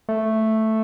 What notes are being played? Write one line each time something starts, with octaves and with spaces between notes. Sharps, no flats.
A3